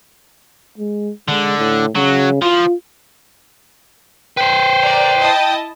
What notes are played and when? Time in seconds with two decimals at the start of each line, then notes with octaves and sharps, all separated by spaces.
0.78 G#3
1.28 D3 G#3
1.58 A2
1.96 C#3 F#3
2.42 F3 F4
4.37 B4 C5 G5
4.83 A#4 D5
5.17 E4 D#5 A5